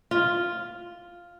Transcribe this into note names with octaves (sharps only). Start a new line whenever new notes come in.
F4